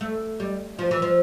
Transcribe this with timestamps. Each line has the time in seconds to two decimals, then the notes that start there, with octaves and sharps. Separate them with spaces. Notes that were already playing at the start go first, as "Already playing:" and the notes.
0.01 A3
0.40 G3
0.79 F3
0.91 E3
1.02 F3